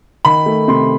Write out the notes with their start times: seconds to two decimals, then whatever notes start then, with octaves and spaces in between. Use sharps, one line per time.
0.25 D#3 B5
0.46 A3
0.68 C3 C6